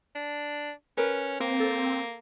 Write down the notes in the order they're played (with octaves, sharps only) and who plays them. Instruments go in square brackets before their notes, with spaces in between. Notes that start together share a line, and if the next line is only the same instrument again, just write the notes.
[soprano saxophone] D4
[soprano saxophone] C#4 [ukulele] A#4 B4
[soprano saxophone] A#3 [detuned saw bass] C4
[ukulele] A4